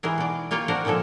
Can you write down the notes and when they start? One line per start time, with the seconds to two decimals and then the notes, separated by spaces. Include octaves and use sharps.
0.03 E3 G#3 G#4 A#4
0.18 B2 D5
0.51 A#3 F4 C#5 F5 G5
0.68 D4 F#4 A#4 C5
0.85 A#2 D3 F3 G#3 A4